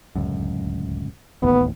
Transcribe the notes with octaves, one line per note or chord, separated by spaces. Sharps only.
D1 C#2 F#2
D1 A1 D#2 B3